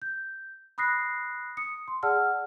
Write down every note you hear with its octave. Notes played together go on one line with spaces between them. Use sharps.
G6
B5 D#6 F#6 A#6 C7
D#6 C#7
C6
G#4 D5 F#5 A5 E6 F6